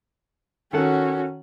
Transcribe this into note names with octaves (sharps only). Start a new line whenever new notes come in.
D#3 C#4 F#4 A4 F#5